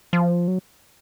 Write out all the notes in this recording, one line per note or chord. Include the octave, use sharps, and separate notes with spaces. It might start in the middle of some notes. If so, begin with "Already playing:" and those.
F3
F#3